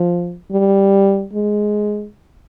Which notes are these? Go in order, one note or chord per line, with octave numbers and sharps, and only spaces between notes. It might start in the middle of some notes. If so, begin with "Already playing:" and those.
Already playing: F3
G3
G#3